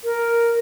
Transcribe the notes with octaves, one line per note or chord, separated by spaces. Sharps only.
A#4